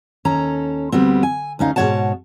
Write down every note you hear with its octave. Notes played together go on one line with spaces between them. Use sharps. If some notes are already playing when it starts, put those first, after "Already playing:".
D#2 C#4 A4 A#5
D2 G3 B3 C4
G#5
D2 C#4 D#4 F5
G#2 B2 D#3 C#5 F#5 A5